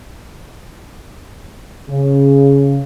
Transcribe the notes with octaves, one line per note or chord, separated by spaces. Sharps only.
C#3